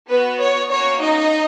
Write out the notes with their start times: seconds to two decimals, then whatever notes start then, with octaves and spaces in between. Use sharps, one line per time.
0.10 B3 F#4 B4
0.39 C#5
0.70 A#3 C#4 F#4 C#5
1.00 D#4 D#5